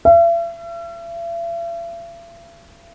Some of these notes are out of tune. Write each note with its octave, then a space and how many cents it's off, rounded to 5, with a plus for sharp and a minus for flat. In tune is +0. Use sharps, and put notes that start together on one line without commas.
E5 +45